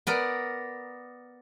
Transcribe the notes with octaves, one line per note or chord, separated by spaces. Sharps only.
B3 A#4 D5